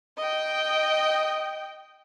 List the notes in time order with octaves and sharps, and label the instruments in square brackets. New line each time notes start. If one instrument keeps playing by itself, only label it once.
[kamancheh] D#5 G5